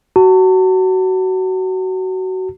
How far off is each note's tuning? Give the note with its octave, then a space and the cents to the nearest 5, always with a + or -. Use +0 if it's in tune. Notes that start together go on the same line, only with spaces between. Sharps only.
F#4 +20 A5 +40